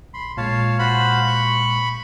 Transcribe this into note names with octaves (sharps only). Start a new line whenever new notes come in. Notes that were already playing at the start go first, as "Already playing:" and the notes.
A#1 B5 C6
A#2 G#3 C#5 F5 A5
F#4 C5 F5 B5
C#6